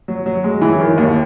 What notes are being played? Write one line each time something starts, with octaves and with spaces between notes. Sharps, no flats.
F#3
F#3
G#3
E3
D#3
D#2